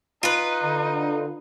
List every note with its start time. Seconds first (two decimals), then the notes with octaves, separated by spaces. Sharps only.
0.23 D#4 F4 B4
0.63 D3